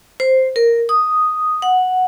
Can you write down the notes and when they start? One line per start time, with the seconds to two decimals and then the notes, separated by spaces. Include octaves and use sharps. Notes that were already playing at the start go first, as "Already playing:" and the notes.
0.20 C5
0.56 A#4
0.89 D#6
1.62 F#5